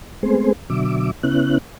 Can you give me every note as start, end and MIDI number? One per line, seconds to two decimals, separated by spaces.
0.23 0.53 56
0.23 0.53 57
0.23 0.53 59
0.23 0.53 60
0.23 0.53 68
0.23 0.53 72
0.70 1.11 47
0.70 1.11 50
0.70 1.11 54
0.70 1.11 76
0.70 1.11 86
1.23 1.58 49
1.23 1.58 59
1.23 1.58 61
1.23 1.58 64
1.23 1.58 90